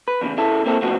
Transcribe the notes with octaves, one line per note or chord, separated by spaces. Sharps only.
B4
E2 A2 C#3
C#3 E4 A4
A#3 C4 E4 G#4 A4
A2 C#3 F3 B3 F#4